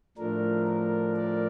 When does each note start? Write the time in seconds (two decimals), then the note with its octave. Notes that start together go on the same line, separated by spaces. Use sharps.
0.18 A2 F3 A3 D4 A#4
0.67 A#4
1.16 A#4 D5